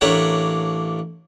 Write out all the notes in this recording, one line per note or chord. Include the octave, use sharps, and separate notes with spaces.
A1 A3 A#3 D4 C#5 F#5